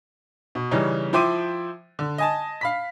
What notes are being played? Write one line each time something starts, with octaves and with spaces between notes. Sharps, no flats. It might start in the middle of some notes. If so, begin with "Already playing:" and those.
B2
C#3 E3 G3 C#4 D#4
F3 E4 C5 G5 D6 D#7
D3
D#5 G#5 A5
F5 B5 B6